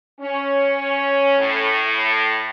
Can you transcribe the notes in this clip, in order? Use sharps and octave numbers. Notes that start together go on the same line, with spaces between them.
C#4
A2